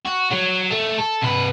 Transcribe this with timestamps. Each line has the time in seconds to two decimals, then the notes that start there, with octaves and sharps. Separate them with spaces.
0.05 F#4
0.31 F#3
0.71 A3
0.98 A4
1.21 C3 B4